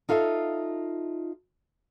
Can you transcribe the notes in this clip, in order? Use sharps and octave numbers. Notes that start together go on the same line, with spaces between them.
D#4 F4 A4 C#5 E5 F5